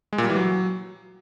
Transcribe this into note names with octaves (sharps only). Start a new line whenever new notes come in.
G#3
A#2
G3
E3
F#3